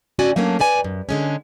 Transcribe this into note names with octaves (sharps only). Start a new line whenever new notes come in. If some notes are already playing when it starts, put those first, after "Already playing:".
A2 D3 C#4 F#4 D5 G#5
F#3 A3 A#3 C#4 D4
G4 B4 D5 G#5
F#2
D3 G#3 C#4